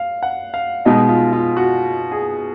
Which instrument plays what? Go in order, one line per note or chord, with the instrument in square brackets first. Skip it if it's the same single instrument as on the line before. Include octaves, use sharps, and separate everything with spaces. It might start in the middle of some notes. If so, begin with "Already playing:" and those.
Already playing: [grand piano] F5
F#5
F5
[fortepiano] B2 G#3 D#4 [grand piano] D#5
[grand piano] F4
F4
F#4
G#4